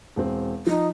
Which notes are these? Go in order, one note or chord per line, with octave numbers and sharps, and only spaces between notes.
E1 C4
F3 D#4